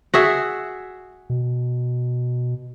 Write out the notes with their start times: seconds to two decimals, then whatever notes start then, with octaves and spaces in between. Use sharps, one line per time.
0.14 F#4 G#4 E5
1.30 B2